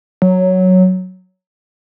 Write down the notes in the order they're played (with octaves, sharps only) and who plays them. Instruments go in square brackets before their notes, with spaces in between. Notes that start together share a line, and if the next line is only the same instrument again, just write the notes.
[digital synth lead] F#3